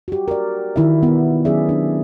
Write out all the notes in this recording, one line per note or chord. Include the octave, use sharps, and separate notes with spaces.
F#4 G4
A#4 D5
D#3 E4 F4 E5
B3
F#3 C#4 G#4 D5 E5
D4